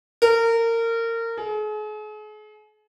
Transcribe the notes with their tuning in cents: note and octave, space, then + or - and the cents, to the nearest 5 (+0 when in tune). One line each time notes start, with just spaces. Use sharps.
A#4 -25
G#4 +40